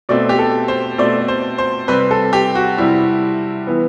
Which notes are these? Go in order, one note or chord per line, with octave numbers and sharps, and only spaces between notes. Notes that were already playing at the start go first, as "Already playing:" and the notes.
B2 A3 C4 D5
G4
A4
C5
B2 A3 C4 D5
C5
C5
C3 G3 C4 B4
A4
G4
F#4
C3 G3 C4 E4
E3 B3